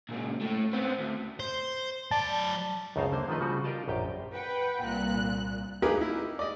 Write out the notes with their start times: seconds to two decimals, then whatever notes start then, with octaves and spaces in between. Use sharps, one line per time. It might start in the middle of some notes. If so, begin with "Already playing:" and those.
0.09 A#2 C#3
0.42 A2 A3
0.73 B3 C4
0.98 D2
1.40 C5
2.11 F#3 D5 A5
2.96 C#2 F#2 C#3 D#4 C5 F5
3.12 D3 A#3 C5
3.29 D#3 F3 A3 B4 D#5
3.40 C#3 F3 G3 F#4
3.64 F4 G4 A#4 D5 D#5 A5
3.88 A#1 F#2 G4 G5
4.33 B4 F#5 G5
4.83 C2 A#2 F#6
5.82 A#3 D#4 G4 G#4 A#4 B4
5.98 D#4 E4
6.39 D5 D#5